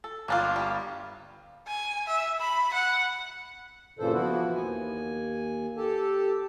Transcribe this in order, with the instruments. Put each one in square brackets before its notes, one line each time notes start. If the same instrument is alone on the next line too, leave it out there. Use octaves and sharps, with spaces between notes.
[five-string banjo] A4
[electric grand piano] G1 F5 [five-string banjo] A#3 D4 F4
[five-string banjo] G3
[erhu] G#5
E5
B5
F#5
[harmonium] G2 A#2 C#3 E3 A4 C5
E3 F3 B3 E4 F#4
D#2 G#5
G4 A4 A5